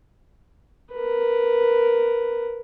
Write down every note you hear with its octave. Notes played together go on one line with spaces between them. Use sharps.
A#4 B4